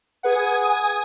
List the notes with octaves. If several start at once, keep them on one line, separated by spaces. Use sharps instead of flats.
G#4 B4 F#5 G#5 D#6